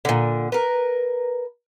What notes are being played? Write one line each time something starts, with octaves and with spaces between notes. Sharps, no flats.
A#2 D3
A#4 B4